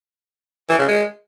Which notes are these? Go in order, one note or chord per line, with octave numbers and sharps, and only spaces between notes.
E3
C#3
G#3